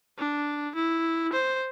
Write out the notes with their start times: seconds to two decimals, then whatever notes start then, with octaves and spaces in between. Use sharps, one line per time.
0.18 D4
0.75 E4
1.33 C5